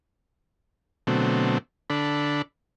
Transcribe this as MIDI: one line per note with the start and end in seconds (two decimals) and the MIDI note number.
1.07 1.58 47
1.07 1.58 50
1.07 1.58 54
1.07 1.58 57
1.07 1.58 60
1.90 2.42 50
1.90 2.42 62
1.90 2.42 69
1.90 2.42 83